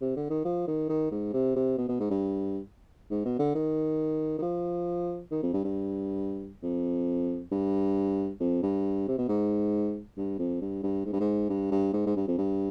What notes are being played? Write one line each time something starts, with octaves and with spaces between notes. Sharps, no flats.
C3
D3
D#3
F3
D#3
D#3
G#2
C3
C3
B2
B2
G#2
G2
G#2
B2
D3
D#3
D#3
F3
D#3
F2
G2
G2
F2
G2
F2
G2
C3
B2
G#2
G2
F2
G2
G2
G#2
G2
G#2
G2
G2
G#2
G#2
G2
F2
G2